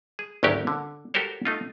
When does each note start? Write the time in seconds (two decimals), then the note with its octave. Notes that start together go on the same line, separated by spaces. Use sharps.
0.19 G#4
0.43 G#1 D2 F#3 C#4 G4 A#4
0.67 D3
1.14 F#4 G4 A4 A#4 C5 C#5
1.45 A3 D#4 F4